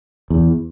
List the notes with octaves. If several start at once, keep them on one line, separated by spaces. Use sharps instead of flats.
E2